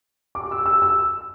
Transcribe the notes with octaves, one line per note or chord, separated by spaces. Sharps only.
D6
E6
E6
E6